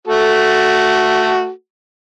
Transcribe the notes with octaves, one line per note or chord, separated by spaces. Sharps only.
A3 F#4 A4